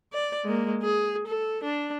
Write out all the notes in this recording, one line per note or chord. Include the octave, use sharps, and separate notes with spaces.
D5
G#3 A#3
G#4
A4
D4